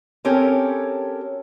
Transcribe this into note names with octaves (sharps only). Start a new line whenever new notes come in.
C4 C#4 G4 A4 A#4 C#5